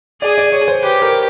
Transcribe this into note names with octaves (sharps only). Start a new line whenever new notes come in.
G#4 D5
D5
C#5
C5
G4 B4
A#4